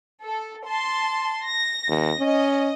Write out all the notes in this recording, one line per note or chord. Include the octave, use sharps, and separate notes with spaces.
A4
A5 C6
A#6
D#2
C#4 D#5